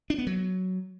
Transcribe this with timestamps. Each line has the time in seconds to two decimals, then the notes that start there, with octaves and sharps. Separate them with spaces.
0.10 D4
0.18 B3
0.27 F#3